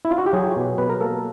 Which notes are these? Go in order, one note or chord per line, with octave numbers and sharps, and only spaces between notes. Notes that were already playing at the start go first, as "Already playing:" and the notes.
E4
F4
F#4
G4
F#3 G#4
B2
B2 B4
A#4
A#3 A4